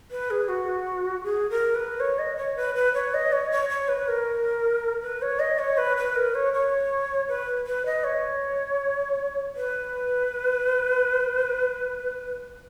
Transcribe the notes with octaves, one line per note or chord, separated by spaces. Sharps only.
B4
G#4
F#4
G#4
A#4
B4
C#5
D#5
C#5
B4
B4
C#5
D#5
C#5
C#5
C#5
B4
A#4
B4
C#5
D#5
C#5
B4
B4
A#4
C#5
C#5
B4
B4
D#5
C#5
B4